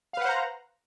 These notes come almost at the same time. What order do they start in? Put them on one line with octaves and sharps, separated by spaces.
F5 B4 F#5 C5 A#5